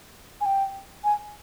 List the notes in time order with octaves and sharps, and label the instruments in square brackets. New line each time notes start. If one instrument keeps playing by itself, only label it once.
[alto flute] G#5
G5
G#5